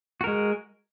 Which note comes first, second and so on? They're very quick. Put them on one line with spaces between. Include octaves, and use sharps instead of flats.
F#4 A#4 G#3